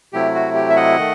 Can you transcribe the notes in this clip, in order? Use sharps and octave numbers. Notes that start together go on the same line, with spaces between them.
C3 F#3 A3 E4 G4
F#4
G4
E5
D#5 F#5
D#3 A3